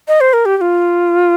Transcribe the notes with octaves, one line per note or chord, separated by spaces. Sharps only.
D#5
C5
A#4
G4
G4
F4